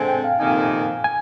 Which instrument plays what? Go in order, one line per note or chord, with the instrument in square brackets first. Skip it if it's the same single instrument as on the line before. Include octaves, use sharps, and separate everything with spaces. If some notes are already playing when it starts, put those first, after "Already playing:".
Already playing: [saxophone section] D3 G#3 C4 [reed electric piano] G#5
[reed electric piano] G5
F5
[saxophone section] F2 C3 D#3 A#3 D#4 [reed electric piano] G#5
[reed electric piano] G#5